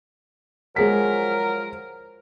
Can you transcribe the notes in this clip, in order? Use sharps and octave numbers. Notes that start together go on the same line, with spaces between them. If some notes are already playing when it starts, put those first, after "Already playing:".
F3 F#3 G#3 G#4 A#4 B6